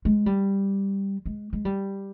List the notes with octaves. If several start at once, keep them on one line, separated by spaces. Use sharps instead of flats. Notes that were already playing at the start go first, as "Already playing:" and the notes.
G#3
G3
G#3
G#3
G3